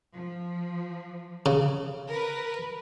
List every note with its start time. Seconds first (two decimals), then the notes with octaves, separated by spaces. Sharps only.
0.15 F3
1.46 C#3
2.09 A#4 B4